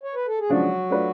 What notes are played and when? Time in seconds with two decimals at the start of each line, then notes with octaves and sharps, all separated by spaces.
0.03 C#5
0.15 B4
0.27 A4
0.39 G#4
0.49 C#3 F3 F#3 G#3 D4 F#4
0.90 A3 D4 F4 B4 D5